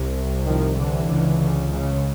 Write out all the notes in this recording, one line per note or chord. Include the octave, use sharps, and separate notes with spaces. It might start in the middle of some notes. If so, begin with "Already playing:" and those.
Already playing: C2 C3
D#3 F3
D3 E3
C#2 C#3
C#3